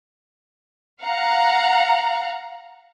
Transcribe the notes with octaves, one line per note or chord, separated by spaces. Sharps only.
F5 F#5 A#5